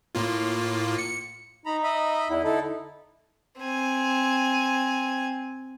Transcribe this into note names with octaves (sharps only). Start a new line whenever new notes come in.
A2 A#3 F4
C#7
D#4 A#5 B5
D#5 E5 B5
E2 E4
D3 D#4 E4 A4
C4 G#5